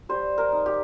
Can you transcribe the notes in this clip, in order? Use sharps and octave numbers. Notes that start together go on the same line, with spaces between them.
G3 C5
A#4
D#4
G4